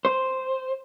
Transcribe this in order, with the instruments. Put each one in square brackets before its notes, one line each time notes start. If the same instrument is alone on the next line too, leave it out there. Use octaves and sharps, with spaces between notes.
[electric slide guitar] C5